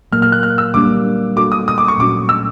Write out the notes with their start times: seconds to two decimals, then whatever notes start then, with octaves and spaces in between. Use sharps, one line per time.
0.12 A#2 F#3 A#3 F6
0.22 F6
0.32 F#6
0.43 F6
0.58 E6
0.74 G3 A#3 D4 G4 D6
1.36 A3 D4 F#4 A4 D6
1.52 D#6
1.68 D#6
1.78 D6
1.88 C#6
1.98 A#2 F#3 A3 C#4 F#4 D6
2.29 E6